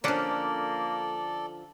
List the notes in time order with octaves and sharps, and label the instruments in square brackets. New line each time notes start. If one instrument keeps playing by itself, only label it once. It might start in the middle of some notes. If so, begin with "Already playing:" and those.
[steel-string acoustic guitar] D3 F3 [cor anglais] A#3 [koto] C#4 D4 F#5 [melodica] A4 D5